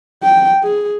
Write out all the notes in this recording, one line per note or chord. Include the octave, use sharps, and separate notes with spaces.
G5
G#4